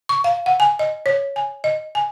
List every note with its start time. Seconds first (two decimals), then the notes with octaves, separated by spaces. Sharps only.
0.09 C#6
0.24 F5
0.46 F#5
0.60 G#5
0.79 D#5
1.06 C#5
1.36 G#5
1.64 D#5
1.95 G#5